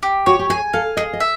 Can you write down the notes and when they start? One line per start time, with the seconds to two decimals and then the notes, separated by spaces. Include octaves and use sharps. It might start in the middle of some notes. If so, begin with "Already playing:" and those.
0.03 G4
0.26 F#4 C#5
0.39 G4
0.50 G#4 G#5
0.73 A4 F5
0.97 G#4 D#5
1.13 D#5
1.20 E5